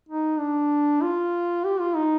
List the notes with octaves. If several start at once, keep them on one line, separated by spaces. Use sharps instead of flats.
D#4
D4
F4
G4
F4
D#4